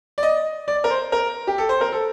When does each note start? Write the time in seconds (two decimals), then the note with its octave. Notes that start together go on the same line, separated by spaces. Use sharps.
0.18 D5
0.23 D#5
0.68 D5
0.84 A#4
0.90 C5
1.12 A#4
1.47 G4
1.58 A4
1.69 C5
1.81 A#4
1.92 A4